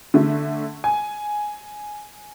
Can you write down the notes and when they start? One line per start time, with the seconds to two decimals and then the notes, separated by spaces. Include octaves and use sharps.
0.14 D3 A3
0.84 G#5